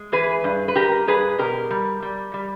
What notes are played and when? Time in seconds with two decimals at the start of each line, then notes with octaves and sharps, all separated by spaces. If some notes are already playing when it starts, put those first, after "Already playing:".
Already playing: G#3
0.12 E3 G#4 B4
0.44 G2
0.68 B4
0.75 G2 G4 A#4
1.07 G2 G#4 B4
1.39 B2 G4 A#4
1.71 G3
2.02 G3
2.34 G3